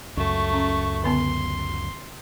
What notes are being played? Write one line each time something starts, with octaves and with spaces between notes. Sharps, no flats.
C#2 F#2 A3 C#6
C#4
D3 B3 A5 C6